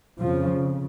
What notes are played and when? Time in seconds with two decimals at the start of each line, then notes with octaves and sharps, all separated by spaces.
0.20 F2 C#3 F3